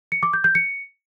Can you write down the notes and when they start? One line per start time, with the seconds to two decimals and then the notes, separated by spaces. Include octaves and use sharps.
0.12 C#7
0.23 D6
0.33 G6
0.44 G6
0.55 C#7